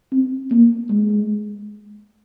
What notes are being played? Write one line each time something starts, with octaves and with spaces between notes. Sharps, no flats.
C4
A#3
G#3